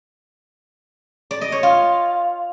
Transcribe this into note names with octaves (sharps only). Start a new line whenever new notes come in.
D5
D#5
C#5
F4